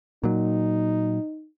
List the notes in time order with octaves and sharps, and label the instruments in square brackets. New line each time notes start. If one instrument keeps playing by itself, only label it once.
[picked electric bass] A#2 F#3 [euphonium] D#4